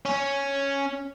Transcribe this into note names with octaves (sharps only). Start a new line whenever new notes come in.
C#4